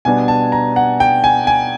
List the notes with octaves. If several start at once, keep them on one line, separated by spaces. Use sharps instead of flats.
B2 G3 B3 D4 G#5
A5
A#5
F#5
G5
G#5
G#5